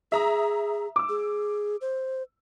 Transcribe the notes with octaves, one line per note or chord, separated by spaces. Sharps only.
G#4 E5 A#5 D#6
D6 E6
G#4
C5